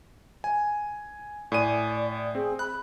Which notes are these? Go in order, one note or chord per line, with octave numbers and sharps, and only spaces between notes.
G#5
A2 D5 G#5 D#7
C4 G#4
B5 F#6